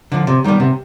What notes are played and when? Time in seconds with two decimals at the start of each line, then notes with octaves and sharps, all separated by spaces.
0.12 D3 F3
0.27 C3
0.44 D#3 G3 B3
0.60 C3